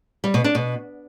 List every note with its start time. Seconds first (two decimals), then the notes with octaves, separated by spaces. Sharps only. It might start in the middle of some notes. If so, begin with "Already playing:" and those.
0.24 G3
0.34 B2
0.44 D4
0.55 B2